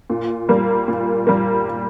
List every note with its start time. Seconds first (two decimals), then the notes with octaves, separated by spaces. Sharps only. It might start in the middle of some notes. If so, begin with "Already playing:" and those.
0.10 A#2
0.49 G3 A#3
0.88 A#2
1.27 G3 A#3